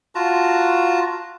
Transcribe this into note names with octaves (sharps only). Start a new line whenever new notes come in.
F4 F#4 A5 A#5